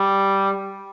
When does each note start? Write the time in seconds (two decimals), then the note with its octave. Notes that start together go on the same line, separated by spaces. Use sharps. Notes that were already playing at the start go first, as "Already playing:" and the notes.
Already playing: G3